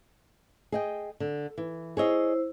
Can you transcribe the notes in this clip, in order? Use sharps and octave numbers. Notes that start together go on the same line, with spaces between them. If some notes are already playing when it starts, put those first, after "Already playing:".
G#4 D#5 G5
D3
E3
E4 G#4 C5 C#5 D#5